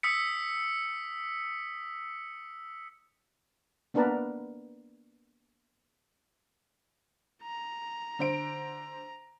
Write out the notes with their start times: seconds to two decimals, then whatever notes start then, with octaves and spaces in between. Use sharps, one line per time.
0.03 D#6 E6 B6 C#7
3.94 A#3 B3 D4 A#4 B4 A5
7.42 A#5
8.19 D3 C5 D7